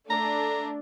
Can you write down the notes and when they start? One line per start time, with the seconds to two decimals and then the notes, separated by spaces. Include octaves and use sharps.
0.10 A3 D4 A#5